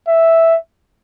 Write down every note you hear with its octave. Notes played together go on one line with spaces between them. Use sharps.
E5